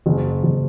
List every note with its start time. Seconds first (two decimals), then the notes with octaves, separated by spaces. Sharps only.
0.06 F#1
0.44 F#1